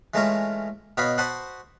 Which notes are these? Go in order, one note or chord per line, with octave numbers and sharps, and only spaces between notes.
E3 G#3 A3 C#4 F4 A#5
B2 B4 C#5 D#5 F5 B5
F#4 C5 F#5 A5 B5 D#6